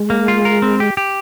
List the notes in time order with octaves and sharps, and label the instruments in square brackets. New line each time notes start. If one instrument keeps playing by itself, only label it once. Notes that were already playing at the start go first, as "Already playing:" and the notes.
Already playing: [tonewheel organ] G#3
[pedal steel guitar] A#3
F4
A#4
C4
G4
G4